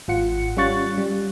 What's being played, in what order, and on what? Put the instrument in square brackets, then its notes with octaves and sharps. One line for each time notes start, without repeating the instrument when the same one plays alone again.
[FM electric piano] G#1 F4 F#5 C#7
G3 C#4 F4 C#6 F#6 A6
G3